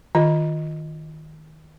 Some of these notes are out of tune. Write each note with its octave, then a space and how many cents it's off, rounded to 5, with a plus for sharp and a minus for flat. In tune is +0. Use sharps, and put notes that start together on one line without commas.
D#3 +0 F4 +0 D#5 +5